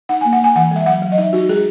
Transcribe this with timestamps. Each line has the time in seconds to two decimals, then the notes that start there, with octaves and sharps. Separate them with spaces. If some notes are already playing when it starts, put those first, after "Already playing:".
0.09 D#4 F#5
0.21 A#3 G#5
0.33 F#5
0.41 A#3 G#5
0.56 E3 F#5
0.71 G#3 E5
0.86 F#3 F#5
1.02 F#3
1.12 D#5
1.18 D#4 E5
1.33 D#4 F#4
1.49 G#3 G#4